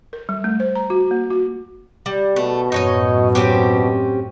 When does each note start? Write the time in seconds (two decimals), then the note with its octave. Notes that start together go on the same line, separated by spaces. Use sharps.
0.13 A#4
0.29 G3
0.44 A3
0.60 C5
0.75 A#5
0.90 F#4
1.11 A#3
1.30 F#4
2.06 G3
2.36 B2 A3
2.72 F#2 A2 D#4 C#5 D#5
3.35 C4 C#4 G4